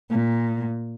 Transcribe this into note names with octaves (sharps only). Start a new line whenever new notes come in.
A#2